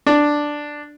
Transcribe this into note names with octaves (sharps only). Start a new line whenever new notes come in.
D4